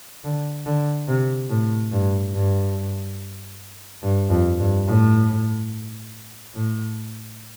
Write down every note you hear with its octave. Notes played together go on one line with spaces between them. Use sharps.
D3
D3
C3
A2
G2
G2
G2
F2
G2
A2
A2